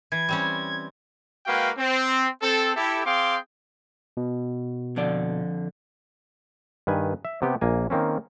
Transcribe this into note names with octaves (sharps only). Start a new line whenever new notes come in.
E3 G#6
G3 C4 C#4
G#3 A#3 F#4 B4 F5 G5
C4
C4 A4
E4 G4 A4
C4 G#4 F5 G5 C6 D6
B2
F2 D3 D5
G2 D#3 B4 G#5
E5
C3 B3 G4
A#1 A#3 G#5
D#3 A#3 C4 C#4